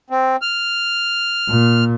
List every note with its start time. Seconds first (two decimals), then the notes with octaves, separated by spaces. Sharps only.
0.10 C4
0.42 F6
1.49 A#2